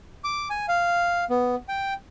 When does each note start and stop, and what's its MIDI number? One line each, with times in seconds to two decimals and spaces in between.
0.24 0.48 86
0.50 0.66 80
0.68 1.24 77
1.30 1.55 59
1.69 1.93 79